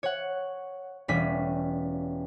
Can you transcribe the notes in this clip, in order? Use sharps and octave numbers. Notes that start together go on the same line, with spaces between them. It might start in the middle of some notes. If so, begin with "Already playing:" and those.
C#5 F#5
E1 G3 C#4 B6